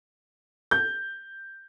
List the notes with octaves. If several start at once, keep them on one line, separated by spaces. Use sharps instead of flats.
G6